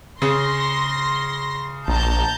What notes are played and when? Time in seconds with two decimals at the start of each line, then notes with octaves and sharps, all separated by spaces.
0.22 C#3 C6 A#6
1.88 A#1 A5 A#5 G6